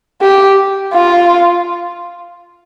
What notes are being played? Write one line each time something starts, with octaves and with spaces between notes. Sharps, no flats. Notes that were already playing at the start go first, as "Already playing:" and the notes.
G4
F4